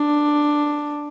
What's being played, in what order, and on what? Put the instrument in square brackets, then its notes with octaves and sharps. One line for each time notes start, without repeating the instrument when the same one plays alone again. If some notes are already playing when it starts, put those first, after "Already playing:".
Already playing: [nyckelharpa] D4